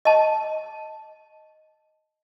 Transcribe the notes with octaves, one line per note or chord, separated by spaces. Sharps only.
D#5 A5